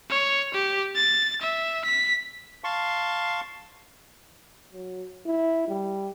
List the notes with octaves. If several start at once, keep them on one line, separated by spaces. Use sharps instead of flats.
C#5
G4
A6
E5
B6
F5 A5 C6 C#6
F#3
E4
G3